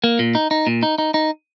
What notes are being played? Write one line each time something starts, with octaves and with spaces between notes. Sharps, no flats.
A#3
A#2
D#4
D#4
A#2
D#4
D#4
D#4